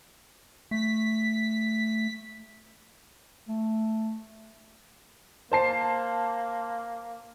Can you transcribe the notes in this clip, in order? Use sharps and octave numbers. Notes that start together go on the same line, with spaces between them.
A3 B6
A3
A#3 C5 A5 C7